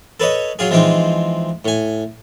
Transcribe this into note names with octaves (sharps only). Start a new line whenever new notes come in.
A4 B4 C#5 D#5
F#3 F4 G#4
E3 F3 G#3 C4 D#4
A2 G#5